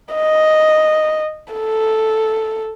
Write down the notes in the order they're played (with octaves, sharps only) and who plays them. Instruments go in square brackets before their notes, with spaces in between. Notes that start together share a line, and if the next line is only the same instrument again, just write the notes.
[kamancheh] D#5
A4